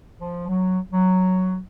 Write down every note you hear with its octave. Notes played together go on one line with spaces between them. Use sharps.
F3
F#3
F#3